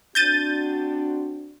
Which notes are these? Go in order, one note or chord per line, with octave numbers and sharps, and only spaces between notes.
C4 D4 F#4 G6 A6 D#7